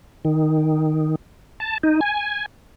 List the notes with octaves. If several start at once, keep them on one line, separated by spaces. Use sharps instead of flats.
D#3
A5
D#4
G#5